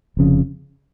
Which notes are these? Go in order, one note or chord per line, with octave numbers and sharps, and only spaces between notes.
F1 F2 C#3